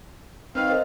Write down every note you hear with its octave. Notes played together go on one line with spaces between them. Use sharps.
D#3 C4 B4 F5 F6
A#4 C5 D#5